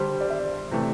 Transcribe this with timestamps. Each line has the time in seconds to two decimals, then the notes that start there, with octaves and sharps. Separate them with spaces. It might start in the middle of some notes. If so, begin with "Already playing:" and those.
Already playing: D3 G3 D4 G4 C5
0.21 D5
0.30 E5
0.71 C3 E3 A3